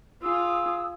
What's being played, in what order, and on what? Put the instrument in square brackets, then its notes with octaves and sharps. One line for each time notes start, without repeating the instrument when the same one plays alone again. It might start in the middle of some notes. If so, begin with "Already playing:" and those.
[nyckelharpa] F4 [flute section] G#4 D#6 E6